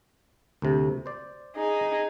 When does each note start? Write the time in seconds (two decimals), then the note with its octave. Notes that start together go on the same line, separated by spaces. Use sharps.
0.62 D2 C3
1.06 C5 D5
1.56 D#4 G#4